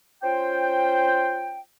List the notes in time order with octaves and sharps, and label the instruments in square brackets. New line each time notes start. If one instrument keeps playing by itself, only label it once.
[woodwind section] C#4 F4 C5 G5